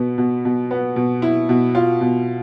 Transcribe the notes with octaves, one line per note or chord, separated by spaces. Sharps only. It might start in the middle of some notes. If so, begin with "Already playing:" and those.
Already playing: B2 B3
B2
B2
B3
B2
E4
B2
F4
B2